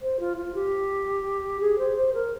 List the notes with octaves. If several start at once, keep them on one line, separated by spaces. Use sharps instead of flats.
C5
F4
F4
G4
G#4
C5
C5
A#4